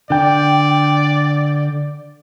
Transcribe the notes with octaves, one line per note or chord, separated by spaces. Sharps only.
D3 D5 G5